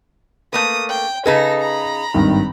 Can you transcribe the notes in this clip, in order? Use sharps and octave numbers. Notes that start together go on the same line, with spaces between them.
A3 A#3 B4 D#6
G5
C#3 D#4 G#4 A4 B4 A#6
A#5 B5
G#1 G2 D#3